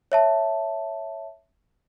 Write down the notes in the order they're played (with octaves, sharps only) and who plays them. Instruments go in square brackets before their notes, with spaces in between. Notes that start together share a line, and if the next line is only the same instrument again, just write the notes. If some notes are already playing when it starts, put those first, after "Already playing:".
[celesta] C#5 E5 A5